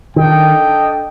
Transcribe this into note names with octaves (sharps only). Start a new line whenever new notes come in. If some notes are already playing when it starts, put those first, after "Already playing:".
D#3 D4 A4 D#5 G5